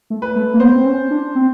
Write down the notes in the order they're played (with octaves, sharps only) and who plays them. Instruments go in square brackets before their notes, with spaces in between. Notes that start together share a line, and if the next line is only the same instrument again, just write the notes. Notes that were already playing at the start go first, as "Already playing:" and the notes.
[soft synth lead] A3
[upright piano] B4
[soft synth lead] A3
A#3
[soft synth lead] B3 [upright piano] C5
[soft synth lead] C4
C#4
D4
C4